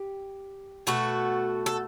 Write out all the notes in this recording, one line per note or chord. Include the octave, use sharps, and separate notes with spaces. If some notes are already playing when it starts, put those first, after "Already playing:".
Already playing: G4
B2 A3 F#4 A4
A4